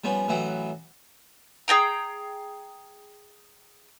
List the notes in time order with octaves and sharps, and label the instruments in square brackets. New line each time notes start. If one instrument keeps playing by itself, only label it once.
[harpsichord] F3 G3 B3 C#4
A1 E3 F#3 B4 F#5 G5
[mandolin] G#4 D#5 G5 A#5